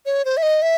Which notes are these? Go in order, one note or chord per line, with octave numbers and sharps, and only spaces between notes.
C#5
C5
E5
D#5
E5